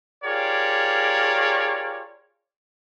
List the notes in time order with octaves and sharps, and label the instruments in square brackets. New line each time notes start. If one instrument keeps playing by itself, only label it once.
[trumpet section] F4 G4 G#4 A#4 C#5 D5